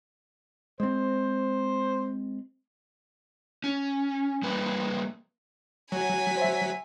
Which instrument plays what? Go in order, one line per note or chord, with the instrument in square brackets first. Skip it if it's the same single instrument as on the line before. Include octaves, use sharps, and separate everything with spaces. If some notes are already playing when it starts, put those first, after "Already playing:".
[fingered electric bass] G#3 C4 [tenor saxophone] C5
[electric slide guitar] C#4
G3 A#3 B4
[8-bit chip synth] F#3 [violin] G#5 B6
[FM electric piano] C5 E5